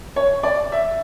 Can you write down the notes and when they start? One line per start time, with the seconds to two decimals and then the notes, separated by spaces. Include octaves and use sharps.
0.16 C#5
0.43 D5
0.72 E5